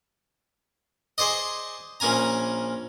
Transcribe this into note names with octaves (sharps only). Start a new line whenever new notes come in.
G#4 C5 D5 D#5
A#1 A#3 C#4 G#5 A#5